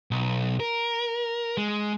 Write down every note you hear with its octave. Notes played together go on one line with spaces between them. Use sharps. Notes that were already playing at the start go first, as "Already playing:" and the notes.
B1
A#4
G#3